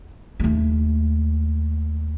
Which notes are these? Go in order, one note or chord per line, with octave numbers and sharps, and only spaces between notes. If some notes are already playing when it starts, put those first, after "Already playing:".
D#2 A3